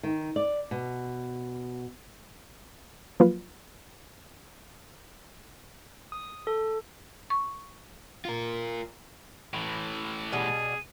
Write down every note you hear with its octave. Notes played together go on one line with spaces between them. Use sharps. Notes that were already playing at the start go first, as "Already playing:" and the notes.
D#3
D5
B2
F3 F#3 A#3 F4 B4
D#6
A4
C#6
F4 A#4
A2 E3
B2 G3 G#4 D#7